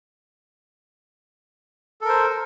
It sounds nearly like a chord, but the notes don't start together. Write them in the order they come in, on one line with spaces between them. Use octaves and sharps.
A4 A#4 C5